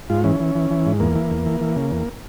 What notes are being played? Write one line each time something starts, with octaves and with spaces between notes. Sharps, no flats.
G#2 F4
E3 C#4
E3
E3
E3
G#2
E2 A#3
E3
E2
E3
E3
C#3
E2